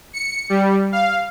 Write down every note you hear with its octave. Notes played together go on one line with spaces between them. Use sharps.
C#7
G3
F5